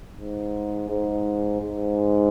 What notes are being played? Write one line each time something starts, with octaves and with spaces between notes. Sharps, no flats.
G#2
G#2
G#2